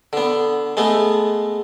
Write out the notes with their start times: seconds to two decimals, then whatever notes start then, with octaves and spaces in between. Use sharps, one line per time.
0.13 D3 B3
0.77 G#3 A3 B3